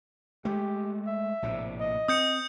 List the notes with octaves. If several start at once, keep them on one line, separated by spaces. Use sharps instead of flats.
G#3 A3 G4
E5
A#1 A2 C3
D#5
C4 D#6 G6 C#7